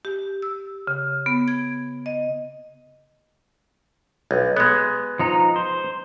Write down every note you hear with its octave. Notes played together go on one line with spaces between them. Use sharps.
G4
E6
C#3
B3
G#6
D#5
B1
G#3 B3
F3 D#4 A#5
C5